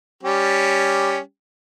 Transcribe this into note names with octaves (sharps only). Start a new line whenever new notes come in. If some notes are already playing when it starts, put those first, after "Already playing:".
G3 C#4 G4